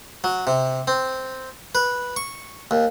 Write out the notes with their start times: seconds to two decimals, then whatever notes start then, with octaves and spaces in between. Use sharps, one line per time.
0.24 F#3
0.47 C3
0.88 C4
1.75 B4
2.16 C#6
2.71 D#2